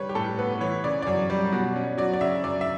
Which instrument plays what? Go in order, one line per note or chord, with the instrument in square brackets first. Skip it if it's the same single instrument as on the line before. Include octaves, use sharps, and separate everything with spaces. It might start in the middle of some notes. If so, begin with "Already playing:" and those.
Already playing: [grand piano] G3 [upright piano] B4 C#5
[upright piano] G4
[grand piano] A2 [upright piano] A4
[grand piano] B3 [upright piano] B4
[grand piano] E3 [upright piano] C#5
[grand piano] C#3 [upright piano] D5
[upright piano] D5
[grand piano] F#2 [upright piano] C#5
[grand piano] G3
B2
C#4
[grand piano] F#3 [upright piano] D5
[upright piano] D5
[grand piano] C#3 [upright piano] E5
[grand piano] F#2 [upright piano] D5
[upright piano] E5